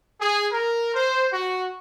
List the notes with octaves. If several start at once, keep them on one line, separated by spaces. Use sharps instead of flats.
G#4
A#4
C5
F#4